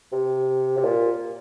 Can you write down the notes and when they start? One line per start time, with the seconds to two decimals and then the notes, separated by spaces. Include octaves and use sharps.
0.13 C3
0.78 C3
0.84 A#2